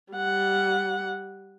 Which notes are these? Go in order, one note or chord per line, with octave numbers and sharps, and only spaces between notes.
G3 F#5